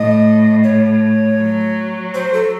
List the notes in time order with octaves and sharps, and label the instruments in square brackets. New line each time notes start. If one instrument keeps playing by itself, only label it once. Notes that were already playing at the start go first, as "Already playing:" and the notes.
Already playing: [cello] A2 [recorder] D#5
[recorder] C#5
[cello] F#3
[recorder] C5
A4